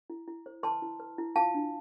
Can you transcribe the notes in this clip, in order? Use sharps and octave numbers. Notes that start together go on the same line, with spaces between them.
E4
E4
C5
B4 A5 C6
E4
B4
E4
F4 F5 A5
D4